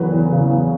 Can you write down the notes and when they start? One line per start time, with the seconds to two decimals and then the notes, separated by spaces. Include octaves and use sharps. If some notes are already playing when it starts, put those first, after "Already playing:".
Already playing: E2 C#3 F#3 B4
0.12 E2
0.32 C#3
0.50 E2